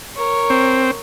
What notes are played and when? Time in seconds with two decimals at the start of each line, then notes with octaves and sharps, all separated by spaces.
0.16 A#4 C#5
0.50 C4